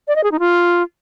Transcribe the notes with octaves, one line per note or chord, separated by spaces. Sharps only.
D5
D#5
G#4
D#4
F4